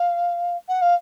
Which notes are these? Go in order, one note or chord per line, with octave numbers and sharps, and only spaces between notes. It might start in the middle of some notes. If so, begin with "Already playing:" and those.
Already playing: F5
F#5
F5